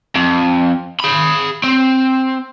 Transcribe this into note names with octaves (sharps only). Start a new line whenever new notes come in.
F2
G#4 B5
C4